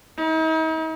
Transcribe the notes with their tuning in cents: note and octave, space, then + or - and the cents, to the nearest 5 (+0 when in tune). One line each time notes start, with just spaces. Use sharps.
D#4 +45